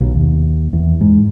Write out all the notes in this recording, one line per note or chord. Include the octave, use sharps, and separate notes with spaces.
B1
D#2
E2
G#2